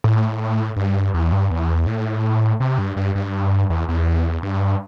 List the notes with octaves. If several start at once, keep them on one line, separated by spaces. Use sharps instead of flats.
A2
G2
E2
G2
E2
A2
C3
G2
G2
G2
E2
E2
G2